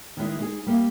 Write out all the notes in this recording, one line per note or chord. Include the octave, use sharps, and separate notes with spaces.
D#3 E3 G#3 E4
G#3 D#4 G#4
G3 A#3